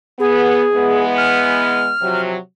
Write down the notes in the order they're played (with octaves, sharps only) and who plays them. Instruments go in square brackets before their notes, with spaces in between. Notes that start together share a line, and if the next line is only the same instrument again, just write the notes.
[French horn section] B3 [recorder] G#4
[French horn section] E3 G#3 B3
[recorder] F6
[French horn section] C3 F3 F#3